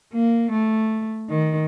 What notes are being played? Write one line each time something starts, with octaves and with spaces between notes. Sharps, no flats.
A#3
A3
D#3